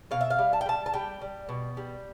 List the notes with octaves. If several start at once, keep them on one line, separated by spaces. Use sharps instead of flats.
B2 F5
E5
F5
G3
A5
G5
G3 A5
A5
G3 G5
G3
B2
G3